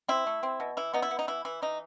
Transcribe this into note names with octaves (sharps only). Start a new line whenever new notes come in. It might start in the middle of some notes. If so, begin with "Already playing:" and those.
C4 E4
A3
C4
B2
E3 E4
B3 D#4
E4
B3
D#4
E3 E4
E3 E4
E3 D#4